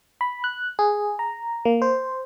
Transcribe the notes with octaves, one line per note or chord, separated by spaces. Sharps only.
B5
F#6
G#4
A#5
A#3
C5